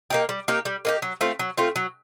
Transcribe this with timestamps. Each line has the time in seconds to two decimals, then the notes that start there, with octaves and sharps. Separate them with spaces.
0.10 A#3 D#4 G4
0.29 G3
0.48 A#3 D#4 G4
0.65 G3
0.85 A#3 D#4 G4
1.02 F#3
1.21 A3 C4 F4
1.39 F#3
1.57 A3 C4 F4
1.76 F#3